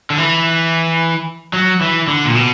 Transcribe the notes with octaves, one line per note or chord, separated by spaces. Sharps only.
D3
E3
F#3
E3
D3
A#2
B2